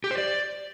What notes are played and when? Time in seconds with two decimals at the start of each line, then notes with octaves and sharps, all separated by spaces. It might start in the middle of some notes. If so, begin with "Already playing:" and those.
0.04 G4
0.11 C5
0.18 D5